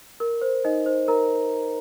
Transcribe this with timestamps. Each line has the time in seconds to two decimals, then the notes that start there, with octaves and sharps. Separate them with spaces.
0.20 A#4
0.42 C5
0.65 D#4 D#5
0.86 C5
1.08 A#4 A#5